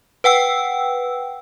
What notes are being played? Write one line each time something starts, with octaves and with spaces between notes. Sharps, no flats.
B4 F#5 G5 E6